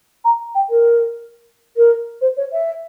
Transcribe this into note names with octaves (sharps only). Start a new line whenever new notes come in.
A#5
G5
A#4
A#4
C5
C#5
E5